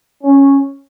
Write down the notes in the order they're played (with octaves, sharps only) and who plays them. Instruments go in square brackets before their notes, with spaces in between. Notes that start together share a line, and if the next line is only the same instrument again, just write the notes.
[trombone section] C#4